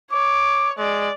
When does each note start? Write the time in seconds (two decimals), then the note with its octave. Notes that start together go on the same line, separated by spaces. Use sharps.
0.12 C#5 D6
0.78 G#3 D5